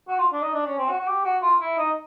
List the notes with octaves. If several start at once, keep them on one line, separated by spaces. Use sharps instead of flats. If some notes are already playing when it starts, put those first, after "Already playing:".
F#4
F4
D4
D#4
D4
C#4
C4
F#4
F#4
G4
F#4
F4
E4
D#4